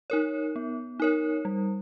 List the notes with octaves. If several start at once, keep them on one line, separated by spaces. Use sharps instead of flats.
D#4 A#4 C#5
B3
D#4 A#4 C#5
G3